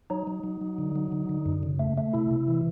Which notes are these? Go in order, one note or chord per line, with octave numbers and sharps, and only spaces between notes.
F#3 D#4
F#3
F#3
F#3
D3
F#3
D3
D3
F#2
C#3
A3
A3
C3 E4
C3
E3